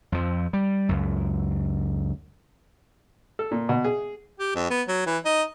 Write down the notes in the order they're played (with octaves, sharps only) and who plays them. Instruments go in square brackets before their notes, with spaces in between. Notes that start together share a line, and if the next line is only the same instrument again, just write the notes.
[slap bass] F2 F3
G3
C#2 F#2
[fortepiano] A4
A#2
B2
G#4
[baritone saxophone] G4
F2
B3
F#3
E3
D#4